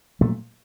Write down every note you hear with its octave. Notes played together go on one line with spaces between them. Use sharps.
A#2 F#3 A3